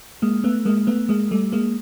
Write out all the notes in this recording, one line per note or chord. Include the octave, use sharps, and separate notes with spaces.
G#3 A#3
A3 B3
G#3 A#3
A3 B3
G#3 A#3
G3 A3
G#3 A#3